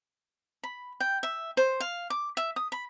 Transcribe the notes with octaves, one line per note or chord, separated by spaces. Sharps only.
B5
G5
E5
C5
F5
D6
E5
D#6
B5